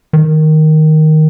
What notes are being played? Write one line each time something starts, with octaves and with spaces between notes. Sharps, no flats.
D#3